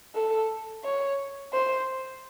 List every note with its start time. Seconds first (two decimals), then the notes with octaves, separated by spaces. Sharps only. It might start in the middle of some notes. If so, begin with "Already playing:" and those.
0.15 A4
0.84 C#5
1.52 C5